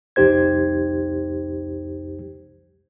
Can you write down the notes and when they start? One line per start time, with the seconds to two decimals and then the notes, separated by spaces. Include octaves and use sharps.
0.16 C2 F2 D#4 G4 C5 G#6